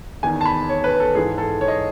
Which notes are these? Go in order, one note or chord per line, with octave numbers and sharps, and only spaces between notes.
E2 D#3 G#5
A5
B5
C#5
B4
A4
G#2 E3 G#4
A4
C#5
D#5